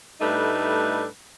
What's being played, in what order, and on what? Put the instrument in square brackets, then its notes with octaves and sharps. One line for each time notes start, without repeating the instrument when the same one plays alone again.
[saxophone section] A2 G3 A3 D4 D#4 B4